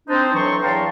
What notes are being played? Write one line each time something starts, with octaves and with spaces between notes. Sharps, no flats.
C4 D4 D#4 C5
A2 E3 F#3 C6 C#6
E2 F5 G5 A5 A#5 C6